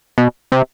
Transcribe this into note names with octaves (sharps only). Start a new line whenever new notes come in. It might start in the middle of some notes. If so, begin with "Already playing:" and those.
B2
C3